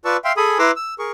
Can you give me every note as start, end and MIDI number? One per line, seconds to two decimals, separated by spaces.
0.05 0.17 65
0.05 0.17 71
0.05 0.17 74
0.05 0.17 81
0.05 0.17 85
0.05 0.17 88
0.24 0.32 76
0.24 0.32 77
0.24 0.32 79
0.24 0.32 84
0.37 0.58 68
0.37 0.58 69
0.37 0.58 80
0.37 0.58 83
0.37 0.58 87
0.59 0.71 64
0.59 0.71 71
0.59 0.71 82
0.59 0.71 84
0.59 0.71 86
0.59 0.71 88
0.76 0.94 88
0.99 1.12 68
0.99 1.12 70
0.99 1.12 85